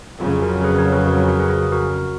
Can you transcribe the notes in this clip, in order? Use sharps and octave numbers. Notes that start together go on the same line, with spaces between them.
F2 C#3 F#3 F4
F#4 A#4
G#4 B4
A#4 C#5
G#4 B4
F#4 A#4
G#4
F#4 A#4
G#4 B4
G#4
F#4 A#4